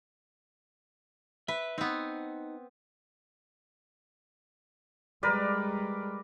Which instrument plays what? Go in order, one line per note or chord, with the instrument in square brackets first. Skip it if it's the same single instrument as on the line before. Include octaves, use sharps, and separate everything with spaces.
[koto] B4 [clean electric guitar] E5
[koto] B3 C4 [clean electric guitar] D#4
[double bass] G3 G#3 [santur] A#4 B4 D5